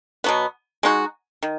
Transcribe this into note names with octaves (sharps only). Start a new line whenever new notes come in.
B2 F#3 B3
G#3 D#4 F#4
D#3